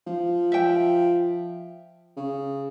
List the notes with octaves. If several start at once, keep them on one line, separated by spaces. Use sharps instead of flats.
F3
E5 G5
C#3